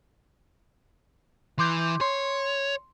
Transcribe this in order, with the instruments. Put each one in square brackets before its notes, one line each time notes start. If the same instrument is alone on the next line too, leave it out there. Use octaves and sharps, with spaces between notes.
[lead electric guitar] E3 [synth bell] C6 D6 G6
[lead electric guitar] C#5 [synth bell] C6